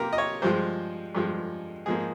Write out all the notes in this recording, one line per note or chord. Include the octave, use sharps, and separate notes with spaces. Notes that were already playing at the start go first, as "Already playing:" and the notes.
Already playing: C3 A#3 G4 A#4
D#5
C#5
G2 F3 G#3 C5
G2 F3 G#3
G#2 F3 A#3 G#4